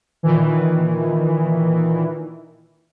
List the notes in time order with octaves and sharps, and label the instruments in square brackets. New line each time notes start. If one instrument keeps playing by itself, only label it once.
[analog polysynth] A#2 D#3 E3